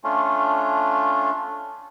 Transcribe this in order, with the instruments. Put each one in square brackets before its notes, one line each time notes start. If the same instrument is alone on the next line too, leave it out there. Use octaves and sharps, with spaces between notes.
[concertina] A3 C#4 D4 F4